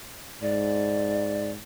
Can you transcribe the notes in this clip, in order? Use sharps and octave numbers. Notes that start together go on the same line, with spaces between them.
G#2 D5